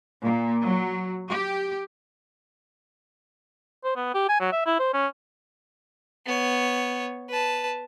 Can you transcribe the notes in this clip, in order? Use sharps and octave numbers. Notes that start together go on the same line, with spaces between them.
A#2
F#3
G4
C5
B3
G4
G#5
F#3
E5
E4
C5
C#4
B3 C#5
B4 A5